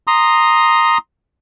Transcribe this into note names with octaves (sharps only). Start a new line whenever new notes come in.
A#5 C6 D#6